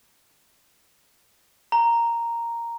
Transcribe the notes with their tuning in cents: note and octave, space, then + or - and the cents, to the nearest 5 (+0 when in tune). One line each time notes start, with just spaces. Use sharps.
A#5 +0